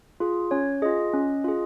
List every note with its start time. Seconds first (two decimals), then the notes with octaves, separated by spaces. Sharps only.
0.20 F4 G#4
0.51 C#4 C#5
0.82 F4 G#4 D#5
1.14 C#4
1.44 F4 G#4